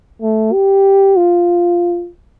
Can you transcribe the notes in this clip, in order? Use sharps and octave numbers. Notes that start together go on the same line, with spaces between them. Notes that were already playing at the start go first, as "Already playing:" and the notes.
A3
G4
F4